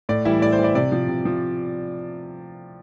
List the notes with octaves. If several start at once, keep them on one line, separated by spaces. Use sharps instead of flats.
A2 D5
E3 G3 E4 E5
A2 D5
C5
E3 G3
D5
C3 D5
F3
C3
F3